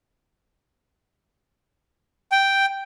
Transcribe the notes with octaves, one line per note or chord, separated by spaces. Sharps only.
G5